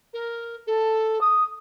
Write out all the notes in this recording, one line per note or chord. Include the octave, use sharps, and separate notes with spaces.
A#4
A4
D#6